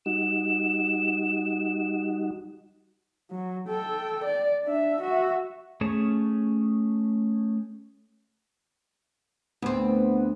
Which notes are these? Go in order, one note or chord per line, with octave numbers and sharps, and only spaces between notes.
G3 D#4 F#4 E7
F#3
A4 G5
D5
D4 E5
F#4 E5
A3 C#4 G#4 C#5 A5
D2 B3 C4